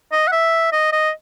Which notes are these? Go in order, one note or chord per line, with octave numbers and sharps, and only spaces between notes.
D#5
F#5
E5
D#5
D#5